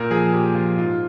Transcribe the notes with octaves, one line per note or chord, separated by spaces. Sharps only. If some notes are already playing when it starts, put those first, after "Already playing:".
Already playing: A#2 A#4
F3 G#4
A#2 G4
F3 F4
G#2 F4